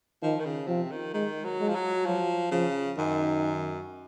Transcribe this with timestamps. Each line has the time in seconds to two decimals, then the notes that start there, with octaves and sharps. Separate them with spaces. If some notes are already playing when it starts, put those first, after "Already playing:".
0.23 D#3 F3
0.40 D#3
0.45 C#3
0.68 C3 F3
0.91 D#3
1.14 D#3 G#3
1.44 F#3
1.60 G#3
1.69 F3
1.75 F#3
2.06 F3 F#3
2.51 C#3 F3
2.97 F#2 D#3